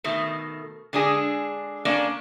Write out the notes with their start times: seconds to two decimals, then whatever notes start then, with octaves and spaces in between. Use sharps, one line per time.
0.04 B2 D#3 A3
0.93 D3 G#3 D4 G#4
1.85 A#3 C#4 D4 D5